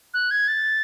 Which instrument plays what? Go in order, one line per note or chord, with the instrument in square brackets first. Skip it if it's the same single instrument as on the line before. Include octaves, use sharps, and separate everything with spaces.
[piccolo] F#6
G#6
A6